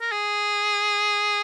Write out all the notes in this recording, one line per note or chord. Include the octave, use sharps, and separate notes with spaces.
A#4
G#4